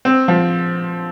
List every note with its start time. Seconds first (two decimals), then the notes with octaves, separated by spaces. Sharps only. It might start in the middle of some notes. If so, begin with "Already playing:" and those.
0.05 C4
0.28 F3